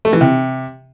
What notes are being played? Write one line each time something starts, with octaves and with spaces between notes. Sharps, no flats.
A3
E3
C3